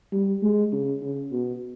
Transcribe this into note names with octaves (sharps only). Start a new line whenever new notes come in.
G3
G#3
C#3
C#3
B2